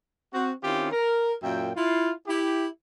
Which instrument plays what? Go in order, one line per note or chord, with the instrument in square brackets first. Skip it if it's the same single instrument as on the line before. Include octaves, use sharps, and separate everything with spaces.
[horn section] C4 F#4
D#3 C4 C#4 E4 F4 G4
A#4
F#2 A#2 F4 E5 G5
E4 F4
E4 G4